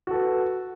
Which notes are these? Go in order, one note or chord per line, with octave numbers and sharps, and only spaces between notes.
F#4 A4 B4